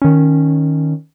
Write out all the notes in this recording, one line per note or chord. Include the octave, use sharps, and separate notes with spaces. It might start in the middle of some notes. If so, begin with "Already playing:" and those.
D#3 C#4